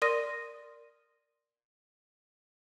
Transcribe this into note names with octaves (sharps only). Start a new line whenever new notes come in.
A#4 D5 C6 D#6 A#6 D#7